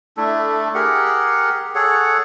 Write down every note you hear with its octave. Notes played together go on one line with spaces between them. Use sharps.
A3 D4 E4 A4
G4 G#4 A#4 F#5
G#4 A4 C#5 F#5